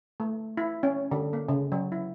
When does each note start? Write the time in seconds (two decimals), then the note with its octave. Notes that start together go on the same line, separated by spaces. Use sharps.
0.20 A3
0.57 E4
0.83 C#4
1.11 D3
1.33 A#3
1.49 C#3
1.72 F#3
1.92 E4